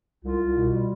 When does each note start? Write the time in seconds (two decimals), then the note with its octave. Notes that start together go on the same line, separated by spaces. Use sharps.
0.22 C2 F4
0.38 C2
0.55 B2
0.72 G3